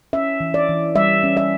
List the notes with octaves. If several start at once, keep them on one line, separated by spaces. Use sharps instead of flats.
C#4 E5
E3
D5
E3
G3 E5
C#4
E5